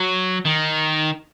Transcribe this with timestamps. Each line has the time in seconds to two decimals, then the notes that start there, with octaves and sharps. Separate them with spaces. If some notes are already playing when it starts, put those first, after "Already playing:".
Already playing: F#3
0.46 D#3